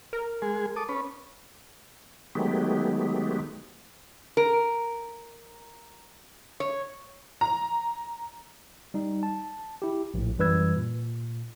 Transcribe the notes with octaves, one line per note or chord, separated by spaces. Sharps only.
A#4
G#3 G#4
A4 D6 D#6
C#4 B4
D#3 F#3 G#3 A3 B3 G4
A#4
C#5
A#5
G3 D#4
A5
E4 G4
A#1 A2
F#2 E3 G3 B4 E6 G#6
A#2